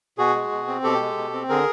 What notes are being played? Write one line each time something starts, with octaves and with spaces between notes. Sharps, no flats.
B2 F#4 G#4
G#3
B2
C4
B2 G4 A4
G#3
B2
C4
D3 G#4 A#4